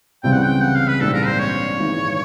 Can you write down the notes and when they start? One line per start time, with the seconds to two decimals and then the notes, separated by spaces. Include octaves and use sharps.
0.23 C#2 C#3 E3 G3 C4 G5
0.33 F#5
0.43 G5
0.62 F#5
0.75 F5
0.88 B4
1.01 A#1 G#2 E3 G3 C4 A4
1.13 A#4
1.26 C5
1.39 C#5
1.78 G#1 G#2 E3